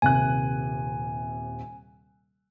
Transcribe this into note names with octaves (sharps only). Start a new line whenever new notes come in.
D#1 C3 G#5 F#6